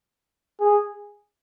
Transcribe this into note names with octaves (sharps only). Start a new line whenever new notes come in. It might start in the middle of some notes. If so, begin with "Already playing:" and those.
G#4